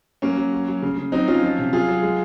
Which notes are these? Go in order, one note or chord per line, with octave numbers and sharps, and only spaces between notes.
F#3 A#3 C#4
F#3
F#3
F#3
C#3
C#3
F#3 C4 D#4
F#3 C#4 F4
F3
C3
F#3 F4 G#4
F#3
G#3